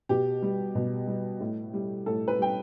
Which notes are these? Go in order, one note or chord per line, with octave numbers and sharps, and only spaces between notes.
B2 G4
G3
B2
G3
A2
G3
A2 A4
B4
G3 G5